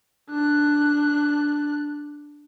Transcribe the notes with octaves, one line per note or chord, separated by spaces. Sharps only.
D4 F#6